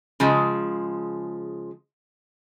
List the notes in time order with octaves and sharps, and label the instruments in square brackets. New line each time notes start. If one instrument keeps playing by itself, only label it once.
[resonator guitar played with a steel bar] C#3 F3 G#3